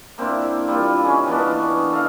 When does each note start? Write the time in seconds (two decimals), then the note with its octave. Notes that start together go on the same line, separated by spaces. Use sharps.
0.18 A#3 C4 D4 E4
0.68 G3 A#3 F4
1.03 C#4 D#4 G#4
1.26 E3 B3 C#4 D4
1.92 A4 D#5 F5